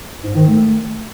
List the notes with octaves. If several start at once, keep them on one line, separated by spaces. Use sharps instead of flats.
G#2
D#3
A3